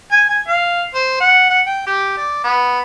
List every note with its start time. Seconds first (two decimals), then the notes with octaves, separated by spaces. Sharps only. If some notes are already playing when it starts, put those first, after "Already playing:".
0.12 G#5
0.30 G#5
0.48 F5
0.94 C5
1.20 F#5
1.50 F#5
1.66 G5
1.87 G4
2.17 D5
2.44 B3